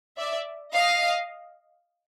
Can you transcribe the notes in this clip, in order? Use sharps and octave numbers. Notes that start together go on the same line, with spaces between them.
D5 E5
D#5 F5